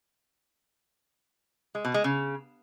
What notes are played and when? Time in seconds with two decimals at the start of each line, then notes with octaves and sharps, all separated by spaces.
1.75 G#3
1.85 B2
1.94 G#3
2.04 C#3